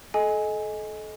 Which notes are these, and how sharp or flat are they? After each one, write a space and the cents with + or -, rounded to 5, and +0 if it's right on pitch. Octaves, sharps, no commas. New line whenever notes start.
A4 -35 D#5 +5 G#5 +0